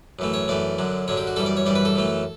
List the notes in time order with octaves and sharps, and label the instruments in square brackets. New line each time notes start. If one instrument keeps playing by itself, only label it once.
[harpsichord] F#2 E3 A3
C#5
F#2 E3 A3 D5
F#2 D3 F#3
F#2 D3 F#3 C#5
G4
F#4
F#2 E3 G3 A4
D5
C#5
F#2 E3 G3 D5
B4
A4
F#2 E3 A3